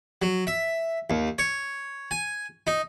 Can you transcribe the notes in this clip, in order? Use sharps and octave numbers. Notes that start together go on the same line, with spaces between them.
F#3
E5
D#2
C#5
G#5
D#4